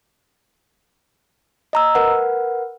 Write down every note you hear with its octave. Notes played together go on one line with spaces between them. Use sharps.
D#5 A#5 E6
A#4 B4 F#5